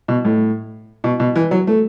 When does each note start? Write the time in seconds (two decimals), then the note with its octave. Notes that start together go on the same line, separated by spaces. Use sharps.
0.08 B2
0.25 A2
1.04 B2
1.20 B2
1.36 E3
1.51 F#3
1.67 A3